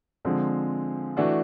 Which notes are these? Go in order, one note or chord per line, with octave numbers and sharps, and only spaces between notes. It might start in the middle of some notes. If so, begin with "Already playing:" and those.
D3 F3 G#3 C4
E3 A3 D4 F#4